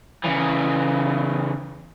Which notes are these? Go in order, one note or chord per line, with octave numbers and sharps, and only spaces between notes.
C#3 E3